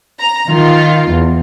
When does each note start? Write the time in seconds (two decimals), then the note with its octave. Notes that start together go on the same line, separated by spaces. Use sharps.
0.20 A#5
0.49 D#3 F4
1.10 E2